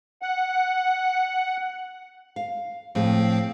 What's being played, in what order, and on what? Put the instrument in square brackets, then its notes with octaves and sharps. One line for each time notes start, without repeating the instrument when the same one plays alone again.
[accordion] F#5
[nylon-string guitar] F5
[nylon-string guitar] A2 G#4 [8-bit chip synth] F3 C4 F5